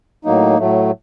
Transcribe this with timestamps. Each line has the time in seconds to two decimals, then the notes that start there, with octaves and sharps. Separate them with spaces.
0.25 A2 F#3 A#3 D#4
0.58 A2 F#3 A3